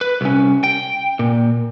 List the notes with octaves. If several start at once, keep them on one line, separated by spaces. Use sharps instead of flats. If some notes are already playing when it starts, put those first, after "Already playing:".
B4
C2 C#4
G5
A#2